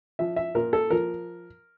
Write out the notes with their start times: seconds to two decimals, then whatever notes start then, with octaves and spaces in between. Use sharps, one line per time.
0.19 F3 E5
0.36 E5
0.55 A#2 A#4
0.73 A4
0.90 F3 A#4